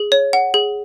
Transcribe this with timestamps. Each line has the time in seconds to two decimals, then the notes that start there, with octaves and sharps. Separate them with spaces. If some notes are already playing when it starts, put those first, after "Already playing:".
Already playing: G#4
0.12 C#5
0.33 F#5
0.54 G#4